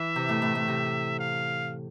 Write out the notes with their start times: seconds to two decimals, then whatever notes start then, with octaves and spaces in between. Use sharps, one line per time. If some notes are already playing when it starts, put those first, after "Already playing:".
Already playing: E3 E5
0.16 C3
0.29 A2
0.42 A2
0.55 A2
0.68 C3
1.19 F5